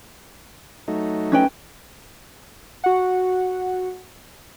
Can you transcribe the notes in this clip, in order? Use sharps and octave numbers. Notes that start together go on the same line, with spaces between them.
F#3 A3 D#4
C#4 B4 G5
F#4 F#5